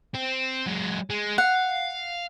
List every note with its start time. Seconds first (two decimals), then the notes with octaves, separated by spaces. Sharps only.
0.15 C4
0.66 F#3 G#3
1.10 G#3
1.38 F5 F#5